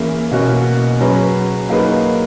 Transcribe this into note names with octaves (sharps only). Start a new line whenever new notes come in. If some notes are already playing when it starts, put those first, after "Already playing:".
Already playing: E3 A#3 C#4 E4 G#4
B2 A#3 C#4 F#4
F#3 C#4 G#4 B4
F#3 A#3 D#4 G#4 B4